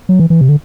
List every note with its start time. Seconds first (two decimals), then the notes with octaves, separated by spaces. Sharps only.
0.09 F#3
0.19 E3
0.30 E3
0.41 C3
0.49 D3